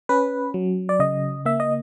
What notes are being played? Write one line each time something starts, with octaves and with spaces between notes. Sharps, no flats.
C#4 B4
F#3
D5
C#3 D#5
A#3 E5
D#5